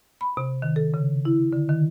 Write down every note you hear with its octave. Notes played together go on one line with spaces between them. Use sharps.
B5
C3
D#3
A4
C#3
E4
D3
D#3